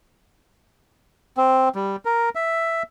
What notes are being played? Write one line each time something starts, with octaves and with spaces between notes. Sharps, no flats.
C4
G3
A#4
E5